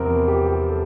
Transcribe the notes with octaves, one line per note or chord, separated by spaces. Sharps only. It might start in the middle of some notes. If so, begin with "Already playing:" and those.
Already playing: E2 C3 F3 C4 A#4 C5
A#4
G4
G4
A4